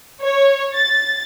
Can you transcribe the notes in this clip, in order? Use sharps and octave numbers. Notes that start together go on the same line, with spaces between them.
C#5
A6